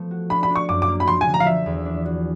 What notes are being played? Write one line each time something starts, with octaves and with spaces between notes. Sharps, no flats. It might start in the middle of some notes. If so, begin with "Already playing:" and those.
Already playing: F3 A3 B3
F#4
D4 B5
B5
D4
C#6
F#2 D6
D6
A#3
B5
F3 C6
G#5
D3
A#5
F5
F3 E5
E2
D4
F#4